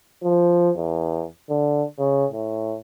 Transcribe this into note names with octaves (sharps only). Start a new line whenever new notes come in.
F3
E2
D3
C#3
A2